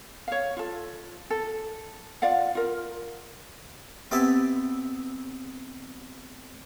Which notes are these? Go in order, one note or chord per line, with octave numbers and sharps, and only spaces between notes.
C#5 F5
F4 A4
A4
F4 D5 F5 F#5
F4 A#4
B3 C4 G4 E5 G#5 A5